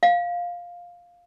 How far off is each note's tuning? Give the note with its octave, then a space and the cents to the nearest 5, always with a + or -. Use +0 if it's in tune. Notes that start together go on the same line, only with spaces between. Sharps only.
F5 +5